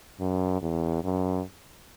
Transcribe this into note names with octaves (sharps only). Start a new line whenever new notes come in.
F#2
E2
F#2